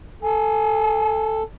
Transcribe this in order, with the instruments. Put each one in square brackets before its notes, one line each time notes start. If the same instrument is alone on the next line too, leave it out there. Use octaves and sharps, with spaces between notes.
[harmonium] A4 [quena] G#5